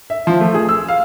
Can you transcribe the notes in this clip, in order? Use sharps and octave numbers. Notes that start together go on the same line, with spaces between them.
E5
F3
A3
G#4
E6
F5